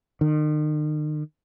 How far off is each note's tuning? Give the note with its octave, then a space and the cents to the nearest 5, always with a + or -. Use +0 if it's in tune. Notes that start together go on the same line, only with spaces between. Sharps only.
D#3 -40